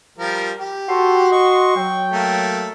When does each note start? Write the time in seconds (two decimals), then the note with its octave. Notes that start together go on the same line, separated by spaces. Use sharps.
0.18 F3 G3 A#4
0.60 G4
0.89 F#4 A4 C6
1.32 D#5 C#6
1.76 F#3 G5
2.12 A3 A#3